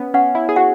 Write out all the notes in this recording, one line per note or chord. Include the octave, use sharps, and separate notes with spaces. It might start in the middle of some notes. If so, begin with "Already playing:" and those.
Already playing: B3 C#4
C#4 F#5
E4
G#4
F#4 F#5